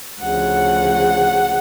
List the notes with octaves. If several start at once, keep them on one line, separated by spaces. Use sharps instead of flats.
D2 C#3 F3 F#5